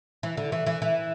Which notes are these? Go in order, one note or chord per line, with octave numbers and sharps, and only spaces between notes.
E3
D3
E3
E3
E3